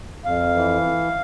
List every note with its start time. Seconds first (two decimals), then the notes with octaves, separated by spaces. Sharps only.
0.24 F2 F5
0.55 E3